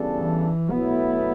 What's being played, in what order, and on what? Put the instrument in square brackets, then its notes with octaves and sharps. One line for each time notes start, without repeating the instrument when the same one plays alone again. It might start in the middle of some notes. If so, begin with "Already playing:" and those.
Already playing: [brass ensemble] E2 C#3 G3 D4 A4
[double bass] E3
[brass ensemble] B2 F#3 A3 E4 [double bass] B3